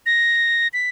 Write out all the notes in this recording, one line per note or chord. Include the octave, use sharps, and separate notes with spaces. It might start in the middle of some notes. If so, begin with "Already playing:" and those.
A#6
B6